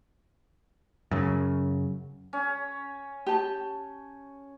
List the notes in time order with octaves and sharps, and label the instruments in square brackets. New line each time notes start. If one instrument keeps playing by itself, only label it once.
[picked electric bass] F#2 C#3
[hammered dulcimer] C#4
[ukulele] G4 A5